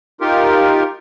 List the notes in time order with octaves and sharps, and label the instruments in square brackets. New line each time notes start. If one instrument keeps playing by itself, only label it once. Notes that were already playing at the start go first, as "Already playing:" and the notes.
[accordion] D#4 F4 G4 A#4